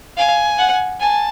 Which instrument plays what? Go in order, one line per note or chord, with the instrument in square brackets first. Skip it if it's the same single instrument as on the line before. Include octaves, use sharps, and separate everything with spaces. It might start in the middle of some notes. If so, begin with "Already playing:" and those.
[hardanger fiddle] F5 [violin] G#5
[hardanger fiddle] F#5
[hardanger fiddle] G#5 [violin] A5